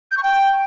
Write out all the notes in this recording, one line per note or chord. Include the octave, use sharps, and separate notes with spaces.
G6
C#6
G5